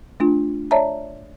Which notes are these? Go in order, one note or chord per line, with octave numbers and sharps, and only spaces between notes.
A3 D4 F4
C#5 D5 E5 A5 A#5